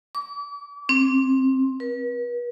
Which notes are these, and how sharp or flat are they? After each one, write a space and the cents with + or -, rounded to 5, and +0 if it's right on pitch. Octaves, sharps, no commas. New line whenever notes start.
D6 -35
C4 +15
B4 -40